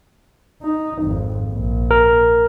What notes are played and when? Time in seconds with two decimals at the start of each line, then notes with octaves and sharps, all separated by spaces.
0.63 D#4
1.03 G#1 F2
1.53 A#1
1.91 A#4